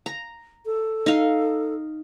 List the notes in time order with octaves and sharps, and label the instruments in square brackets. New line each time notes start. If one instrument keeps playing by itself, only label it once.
[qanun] A#5
[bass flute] A4
[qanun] D#4 F5